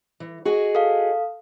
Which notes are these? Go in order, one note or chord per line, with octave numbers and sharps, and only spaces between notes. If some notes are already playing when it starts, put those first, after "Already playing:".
E3
F#4 G#4 D#5
A4 F5